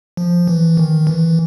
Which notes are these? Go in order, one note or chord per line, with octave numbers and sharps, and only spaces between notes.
F3
E3
D#3
E3